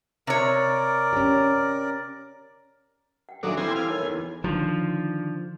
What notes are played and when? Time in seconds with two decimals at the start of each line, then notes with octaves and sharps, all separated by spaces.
0.27 C3 A#4 C#5 D5
1.13 C#4 G4
3.29 F#5 G5
3.43 D#2 A#2 F#3 D4 A4 E5
3.57 E3 G3 C4 G#5
3.76 F5 G#5
3.88 D#4 A#4 C#5 G#5
4.03 E2
4.44 D3 D#3 F3